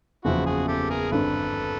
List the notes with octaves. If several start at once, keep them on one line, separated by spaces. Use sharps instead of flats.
F#1 E2 C#3 F3 E4 F#4
F#4 G#4
G4 A4
G#4 A#4
G#1 G2 D3 A4 B4